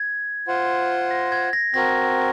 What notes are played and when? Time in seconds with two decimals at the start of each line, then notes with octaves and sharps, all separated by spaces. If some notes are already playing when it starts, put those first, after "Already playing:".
Already playing: G#6
0.48 F4 C5 F#5
1.11 A#6
1.32 G#6
1.53 A#6
1.74 C4 F#4 A#4 A#6